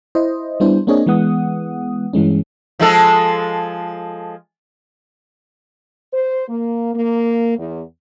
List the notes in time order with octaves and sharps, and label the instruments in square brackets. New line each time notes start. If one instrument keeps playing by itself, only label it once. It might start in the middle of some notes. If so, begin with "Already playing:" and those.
[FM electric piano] E4 C5 D#5
G3 B3 D4 E4 C5
A#3 C4 D4 G#4 C#5 D#5
E3 G#3 B3 F#5 D#6
G2 E3 G#3 C#4
[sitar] F3 G#3 A4
[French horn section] C5
A#3
A#3
E2